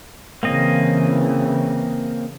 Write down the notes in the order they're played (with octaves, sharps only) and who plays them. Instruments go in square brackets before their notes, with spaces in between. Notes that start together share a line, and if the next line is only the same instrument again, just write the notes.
[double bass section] C#3 E3 [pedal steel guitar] A#3 C4 D#5